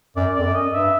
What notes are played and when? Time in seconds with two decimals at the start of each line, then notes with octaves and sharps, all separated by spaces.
0.16 F#2 D5
0.35 F2 D5
0.45 F#2
0.53 D#5
0.73 G2 E5